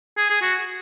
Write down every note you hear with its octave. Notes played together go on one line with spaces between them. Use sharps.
G#4
G#4
F#4